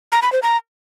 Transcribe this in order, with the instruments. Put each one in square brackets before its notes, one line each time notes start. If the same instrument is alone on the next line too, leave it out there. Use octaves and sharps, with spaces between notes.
[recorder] A#5
B5
C5
A#5